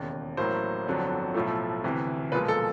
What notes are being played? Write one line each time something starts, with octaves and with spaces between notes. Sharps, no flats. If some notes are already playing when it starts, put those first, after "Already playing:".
Already playing: E1 D#2 C#3
A1 A2 F#3 A#3 C5
G1 F2 D3 F#3
B1 A2 F3 A3
D2 C3 E3
B1 A#2 F3 G#3 B4
A4